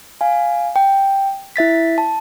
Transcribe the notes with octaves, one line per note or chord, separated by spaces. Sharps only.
F5 G#5
G5
E4 E5 A6 B6
A5